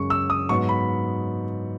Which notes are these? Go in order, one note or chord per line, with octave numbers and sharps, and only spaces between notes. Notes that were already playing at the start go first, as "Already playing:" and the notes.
Already playing: F#2 C#3 G#3 C#4 C#6
E6
D#6
G#2 F#3 B3 C#6
B5